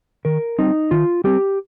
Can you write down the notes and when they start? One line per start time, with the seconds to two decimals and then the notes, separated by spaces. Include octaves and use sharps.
0.25 D#3 A#4
0.59 G3 C4 D#4
0.91 D#3 F4
1.24 G3 C4 G4